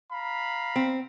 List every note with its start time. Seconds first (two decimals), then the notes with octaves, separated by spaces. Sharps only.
0.12 F5 A#5 B5
0.76 C4